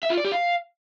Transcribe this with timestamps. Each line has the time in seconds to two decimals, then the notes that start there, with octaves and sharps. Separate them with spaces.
0.03 E5
0.10 F4
0.17 D5
0.25 G4
0.32 F5